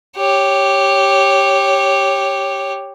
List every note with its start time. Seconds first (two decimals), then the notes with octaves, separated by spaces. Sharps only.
0.18 G4 C#5